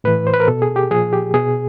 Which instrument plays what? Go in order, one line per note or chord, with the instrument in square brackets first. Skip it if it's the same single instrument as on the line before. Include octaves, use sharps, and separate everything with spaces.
[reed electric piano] A2 E3 B4
C5
B4
A#4
B2 A4
G#4
G4
A#2 F3 G#4
G4
B2 G#4